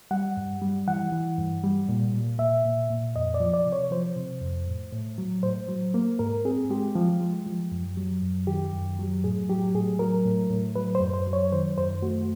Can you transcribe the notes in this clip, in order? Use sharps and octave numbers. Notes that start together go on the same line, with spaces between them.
G3 F#5
G2
G3
E3 F#5
E3
G2
G3
A#2
A#2
A#2 E5
A#2
A#2
F2 D#5
D5
F3
D5
C3
C#5
F3 C5
C3
F2
A2
A2
F#3
A2 C5
F#3
A#3
G#2 A#4
C4 G#4
G#3 G4
F3
G#3
F3
F#2
F#3
F#2
D#3 G4
F#2
F#3
A2 G#4
F#3 G4
A2 G#4
F#3 A#4
A2
A2
F#3 B4
C5
F#2
C5
F#3
C#5
D#3 C5
F#2 C5
A3 F#4